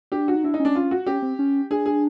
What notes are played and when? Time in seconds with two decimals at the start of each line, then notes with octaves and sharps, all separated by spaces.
0.12 D4 G4
0.28 F#4
0.35 D#4
0.44 D4 E4
0.54 D#4
0.60 C#4
0.65 D4
0.75 F4
0.91 F#4
1.06 C#4 G4
1.22 C4
1.39 C#4
1.70 D4 G#4
1.86 G#4